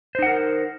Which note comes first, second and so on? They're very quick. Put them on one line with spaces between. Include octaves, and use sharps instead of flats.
C5 D#4 F#5 A#4